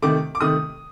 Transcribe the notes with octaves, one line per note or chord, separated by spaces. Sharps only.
C3 D#3 A3 D6
D6
C3 D#3 A3 D#6